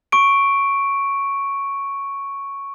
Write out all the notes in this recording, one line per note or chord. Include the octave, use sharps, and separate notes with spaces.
C#6 D7